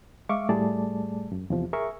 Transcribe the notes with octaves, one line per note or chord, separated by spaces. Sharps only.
G#3 E5 F5 C#6 D6
A2 G3 A3 G#4 D5 A5
F#2
E2 C3 F3
G#4 A#4 E5 C#6